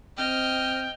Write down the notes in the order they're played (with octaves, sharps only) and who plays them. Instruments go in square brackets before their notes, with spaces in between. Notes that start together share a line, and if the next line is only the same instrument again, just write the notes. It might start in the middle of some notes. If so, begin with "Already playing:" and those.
[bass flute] C4 [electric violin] D#5 F6 [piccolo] G5